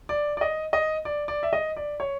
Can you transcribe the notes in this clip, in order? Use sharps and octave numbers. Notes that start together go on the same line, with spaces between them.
D5
D5
D#5
D#5
D5
D5
E5
D#5
D5
C#5